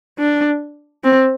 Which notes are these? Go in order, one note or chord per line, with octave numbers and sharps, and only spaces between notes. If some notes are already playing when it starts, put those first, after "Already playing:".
D4
C4